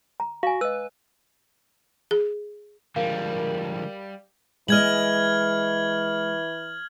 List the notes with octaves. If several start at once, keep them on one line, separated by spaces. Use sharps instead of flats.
A#5
F#4 F5 G#5
B4 D#5 E6
G#4
D3 F3 G3 G#3 A#4 F5
E3 G#3 D#5 F6 G#6 F#7